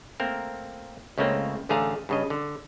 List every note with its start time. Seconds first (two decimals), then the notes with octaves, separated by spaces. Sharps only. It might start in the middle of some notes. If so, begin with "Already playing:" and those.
0.20 A3 A#3 C4 A#4
1.18 C#2 C#3 A3 A#3 C4
1.69 A1 D3 A3 G#4 F5 A#5
2.09 G2 C#3 D#5
2.30 D3